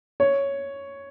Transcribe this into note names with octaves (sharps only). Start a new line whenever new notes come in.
C#5